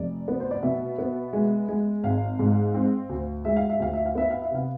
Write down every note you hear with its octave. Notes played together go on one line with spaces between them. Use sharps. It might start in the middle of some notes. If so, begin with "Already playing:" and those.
Already playing: F1 D5
B3
C5
D5
B2 E5
B3
G#3
G#3
G#1 F5
G#2
C4
D2
G#3 E5
F5
E5
D2 F5
E5
F5
B3 E5
F5
E5
C3 F5